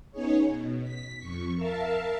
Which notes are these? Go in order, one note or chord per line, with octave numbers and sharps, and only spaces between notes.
B3 C#4 D#4 G#4 C#5
B2
B6
F2 C#6
A#4 E5 F5 A5